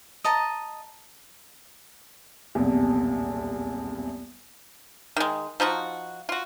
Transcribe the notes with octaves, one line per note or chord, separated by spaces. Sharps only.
D#5 A5 A#5
D#1 B1 E2 C3
D#3 G#3
F3 D#4 F4 F#4
F4 F#4